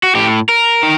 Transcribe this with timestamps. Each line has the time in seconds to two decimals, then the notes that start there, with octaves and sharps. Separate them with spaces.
0.03 F#4
0.15 A2 G4
0.49 A#4
0.83 D#3